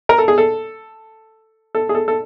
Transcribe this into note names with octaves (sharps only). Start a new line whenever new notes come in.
A#4
A4
G#4
A4
A4
G#4
A4
A4